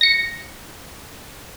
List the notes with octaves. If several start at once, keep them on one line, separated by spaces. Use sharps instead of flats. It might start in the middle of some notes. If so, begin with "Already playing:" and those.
A#6 C#7